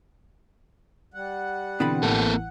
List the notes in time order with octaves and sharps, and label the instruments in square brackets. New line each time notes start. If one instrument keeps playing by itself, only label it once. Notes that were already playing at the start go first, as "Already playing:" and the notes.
[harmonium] G3 F#5
[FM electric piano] B2 D3 E3 [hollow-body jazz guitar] B3 C4 B5
[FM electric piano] A1 E3 [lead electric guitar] A#3 A4
[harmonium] F#5